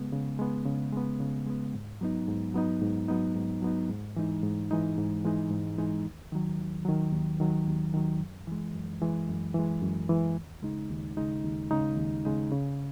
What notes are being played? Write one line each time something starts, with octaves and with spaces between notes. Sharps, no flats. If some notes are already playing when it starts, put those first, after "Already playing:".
Already playing: C#3 G#3 B3
C#3
G#3 B3
C#3
G#3 B3
C#3
G#3 B3
G#2
F#3 B3 D#4
G#2
F#3 B3 D#4
G#2
F#3 B3 D#4
G#2
F#3 B3 D#4
G#2
E3 G#3 D#4
G#2
E3 G#3 D#4
G#2
E3 G#3 D#4
G#2
E3 G#3 D#4
D#2
D#3 F#3
D#2
D#3 F#3
D#2
D#3 F#3
D#2
D#3 F#3
F#2
E3 G#3
F#2
E3 G#3
F#2
E3 G#3
F#2
E3 G#3
D#2
C#3 G#3 D#4
D#2
C#3 G#3 D#4
D#2
C#3 G#3 D#4
D#2
C#3 G#3 D#4
C#3